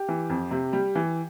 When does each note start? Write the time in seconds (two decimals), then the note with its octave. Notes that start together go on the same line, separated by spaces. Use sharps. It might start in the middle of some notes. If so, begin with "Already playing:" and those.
Already playing: G4
0.08 E3
0.30 F2
0.51 C3
0.73 G3
0.95 E3